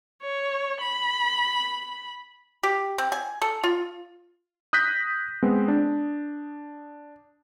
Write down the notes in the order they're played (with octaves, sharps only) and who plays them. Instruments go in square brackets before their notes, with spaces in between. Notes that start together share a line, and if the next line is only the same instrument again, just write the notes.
[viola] C#5
B5
[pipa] G4
C4
G#5
A4
F4
[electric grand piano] D#6 F#6 G6 A#6 B6
G#3 B3 C4
D4